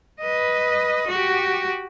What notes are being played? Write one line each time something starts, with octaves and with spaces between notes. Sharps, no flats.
B4 D#5
F#4 G4